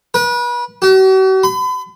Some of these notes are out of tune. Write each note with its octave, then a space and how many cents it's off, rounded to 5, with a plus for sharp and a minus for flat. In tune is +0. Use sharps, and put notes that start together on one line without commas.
B4 -35
F#4 +45
B5 +40